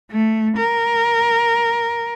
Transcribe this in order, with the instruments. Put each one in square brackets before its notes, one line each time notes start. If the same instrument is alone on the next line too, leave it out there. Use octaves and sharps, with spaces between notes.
[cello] A3
A#4